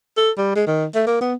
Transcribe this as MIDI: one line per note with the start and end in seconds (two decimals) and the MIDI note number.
0.17 0.30 69
0.38 0.54 55
0.55 0.64 56
0.67 0.85 51
0.95 1.03 57
1.07 1.19 58
1.21 1.34 59